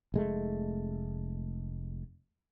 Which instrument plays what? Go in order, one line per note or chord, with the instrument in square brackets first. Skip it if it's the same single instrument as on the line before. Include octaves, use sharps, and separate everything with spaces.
[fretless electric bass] F1 G#3 A3